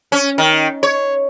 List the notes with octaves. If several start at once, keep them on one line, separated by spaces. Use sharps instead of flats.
C#4
D#3
C#5